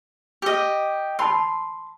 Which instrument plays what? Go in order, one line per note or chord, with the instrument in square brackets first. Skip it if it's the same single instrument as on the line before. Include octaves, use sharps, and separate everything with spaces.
[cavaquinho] G4 D#5
[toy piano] A5 B5 E6 [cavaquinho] C6